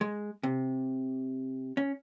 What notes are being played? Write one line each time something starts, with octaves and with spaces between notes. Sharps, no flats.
G#3
C3
C#4